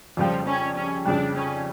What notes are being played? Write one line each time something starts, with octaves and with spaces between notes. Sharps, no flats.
F2 C#3 F3 G3
C#4
C#4
F2 C#3 G3 D4
C#4